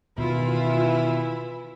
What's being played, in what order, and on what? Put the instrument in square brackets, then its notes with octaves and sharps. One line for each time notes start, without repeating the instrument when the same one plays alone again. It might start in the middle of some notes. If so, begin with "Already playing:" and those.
[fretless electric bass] B2 D#3 [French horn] E3 [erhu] E4 [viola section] F4